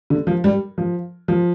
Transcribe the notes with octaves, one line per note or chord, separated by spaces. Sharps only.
D3
F3
G3
F3
F3